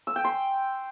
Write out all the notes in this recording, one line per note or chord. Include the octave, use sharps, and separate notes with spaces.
E6
G5
C6